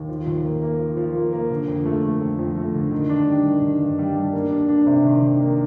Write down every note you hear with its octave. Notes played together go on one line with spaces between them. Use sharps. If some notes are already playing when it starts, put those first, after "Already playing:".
Already playing: D#2
F3
D#2
A#3
A#3
F3
F3
A#3
A#3
D3
F2
A3
A3
F2
F2
A3
D3
D#3
D4
G3
D#3
D#3
G2
G3
D4
A#3
D4
D4
C3
D#3
D#3
A#3